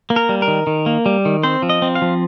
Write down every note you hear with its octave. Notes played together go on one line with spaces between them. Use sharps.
A#3
A#4
G3
A#4
D#3
D#3
A#3
G3
D#3
C4 C5
F3
D#5
C4
F5
F3